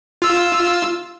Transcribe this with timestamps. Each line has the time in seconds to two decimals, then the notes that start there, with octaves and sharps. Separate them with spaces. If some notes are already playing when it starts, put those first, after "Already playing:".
0.22 F4 E6